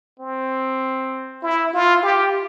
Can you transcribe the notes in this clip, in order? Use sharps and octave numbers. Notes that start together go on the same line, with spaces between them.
C4
E4
F4
G4